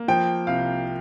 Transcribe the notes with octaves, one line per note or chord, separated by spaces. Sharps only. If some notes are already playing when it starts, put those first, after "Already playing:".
Already playing: A#3
F3 G5
C2 F5